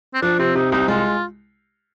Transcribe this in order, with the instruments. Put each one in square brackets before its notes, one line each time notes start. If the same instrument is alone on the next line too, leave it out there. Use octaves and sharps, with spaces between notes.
[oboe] C4
[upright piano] F3 [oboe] D4
[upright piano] C3 [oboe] C4
[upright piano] C3 [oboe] D#4
[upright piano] C2 [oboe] D#4
[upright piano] G#3 [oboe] F4